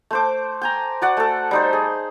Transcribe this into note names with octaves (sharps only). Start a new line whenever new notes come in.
A3 C5 D6
G5 G#5 A#5
F#4 D5 F#5
A3 A4
G3 D#4 C5
G#4